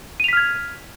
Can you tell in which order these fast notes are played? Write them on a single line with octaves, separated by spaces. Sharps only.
D#7 F7 B6 F6 G#6